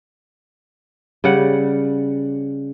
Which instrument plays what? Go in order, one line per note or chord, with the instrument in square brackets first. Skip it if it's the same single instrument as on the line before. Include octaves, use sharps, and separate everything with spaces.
[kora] C#3 G3 D5 F#5